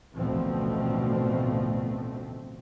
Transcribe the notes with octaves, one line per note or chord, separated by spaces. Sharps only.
A1 D2 B2 F3 A3 C4